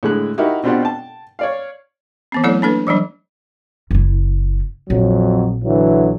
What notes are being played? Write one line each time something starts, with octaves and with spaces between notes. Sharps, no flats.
A2 D3 G#3 F#6
D#4 E4 F#4 G4 A#4
B2 C4 D4 F4 G4 F#5
G5 A5
C#5 D5 F5
E3 B3 C4
F#3 A3 C4 E4 A4 C#5
A#3 D4 A4 B4
E3 F#3 G3 D4
F#1 E4
A#1 F2 F#3
D3 E3 F#3